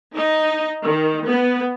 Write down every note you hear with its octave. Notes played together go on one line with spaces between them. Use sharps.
D#4
D#3
B3